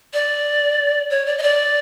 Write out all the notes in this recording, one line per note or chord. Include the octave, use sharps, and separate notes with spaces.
D5
C#5
D5
D#5
D5